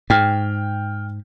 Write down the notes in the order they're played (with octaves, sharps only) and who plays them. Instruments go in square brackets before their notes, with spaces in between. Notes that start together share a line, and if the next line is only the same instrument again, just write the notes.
[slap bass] G#2 [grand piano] G5 F6